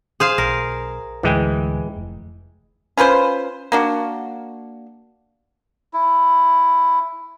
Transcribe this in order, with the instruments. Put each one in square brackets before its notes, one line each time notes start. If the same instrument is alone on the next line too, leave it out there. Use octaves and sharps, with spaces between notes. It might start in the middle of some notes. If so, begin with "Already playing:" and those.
[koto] G#4 C5 F5
[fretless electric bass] B1 [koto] A#4
[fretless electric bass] D2 A2 [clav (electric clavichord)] E3 G#3 G5
[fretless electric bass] F1
[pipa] C#4 F4 B4 C5
A#3 D4 F#4
[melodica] E4